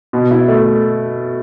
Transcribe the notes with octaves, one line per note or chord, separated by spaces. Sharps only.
B2
E4
A3